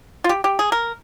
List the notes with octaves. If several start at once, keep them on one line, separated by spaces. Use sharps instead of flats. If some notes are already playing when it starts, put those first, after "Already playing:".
F4
G4
G4
G#4
A#4